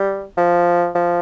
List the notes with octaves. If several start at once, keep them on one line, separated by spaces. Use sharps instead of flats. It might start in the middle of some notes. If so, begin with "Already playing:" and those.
Already playing: G3
F3
F3